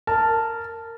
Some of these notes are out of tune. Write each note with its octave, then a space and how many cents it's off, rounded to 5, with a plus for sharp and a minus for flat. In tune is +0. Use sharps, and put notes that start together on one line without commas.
A#4 -15 A5 +0